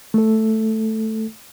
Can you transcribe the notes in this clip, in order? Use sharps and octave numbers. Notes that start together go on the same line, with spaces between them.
A3 A4